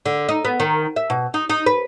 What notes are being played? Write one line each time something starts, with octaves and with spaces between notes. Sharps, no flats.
D3
D#4
B3
D#3
E5
B2
D#4
D#4
B4